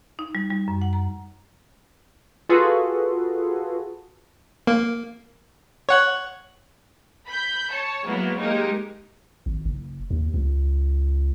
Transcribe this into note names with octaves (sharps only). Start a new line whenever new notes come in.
D#4
G3
G3
F#2
F#5
A#5
F4 F#4 G#4 A4 B4
A#3
C#5 F#5 F#6
B5 G6
C#5 A5
F#3 G#3 A#3 B3 E4 F#4
G#3 A#3 D#4 G4 A#4
G#1
F#1
D#2
C#2